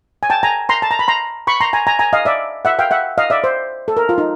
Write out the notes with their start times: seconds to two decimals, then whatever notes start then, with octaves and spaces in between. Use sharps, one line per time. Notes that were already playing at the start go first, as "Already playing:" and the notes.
0.23 G#5
0.30 G5 A5
0.43 G#5 A#5
0.69 A#5 C6
0.82 A5
0.91 A#5
0.99 B5
1.08 A#5 C6
1.47 B5 C#6
1.61 A#5 C6
1.73 G#5 A#5
1.87 G#5 A#5
1.99 G#5 A#5
2.13 D#5 F5
2.25 D5 E5
2.65 E5 F#5
2.79 F5 G5
2.91 E5 F#5
3.18 D#5 F5
3.30 D5 E5
3.44 C5
3.88 A4
3.97 A#4
4.09 F4
4.18 D#4